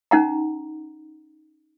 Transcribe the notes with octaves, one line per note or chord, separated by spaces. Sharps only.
C#4 D#4 F#5 A#5